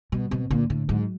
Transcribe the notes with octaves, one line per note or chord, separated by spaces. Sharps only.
B2 G3
B2 C4
A#2 D3
A2 D3
G#2 F#3